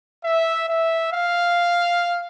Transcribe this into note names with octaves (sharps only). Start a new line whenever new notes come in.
E5
E5
F5